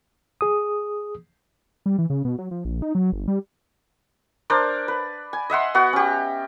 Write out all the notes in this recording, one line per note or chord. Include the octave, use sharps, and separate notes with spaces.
G#4 D#6
G3
E3
C#3
B2
F#3
F3
A#1
D#4
F#3
G1
G3
D4 A#4 C5 D5
B4
G#5
D#5 E5 F#5 C6
B3 F#4 F#5
C#4 G4